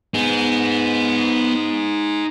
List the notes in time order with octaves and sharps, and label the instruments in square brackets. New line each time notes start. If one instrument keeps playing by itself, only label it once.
[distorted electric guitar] B3 [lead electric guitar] D#4 G#4